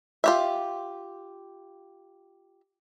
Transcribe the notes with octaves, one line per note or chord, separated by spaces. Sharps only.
F4 G4 E5